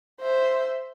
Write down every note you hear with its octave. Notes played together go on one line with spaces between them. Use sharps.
C5 E5